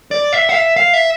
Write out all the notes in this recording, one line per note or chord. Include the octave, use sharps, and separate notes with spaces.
D5
E5
F5
E5
F5
E5